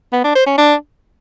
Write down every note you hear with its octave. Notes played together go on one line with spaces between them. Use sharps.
B3
D4
C5
C#4
D4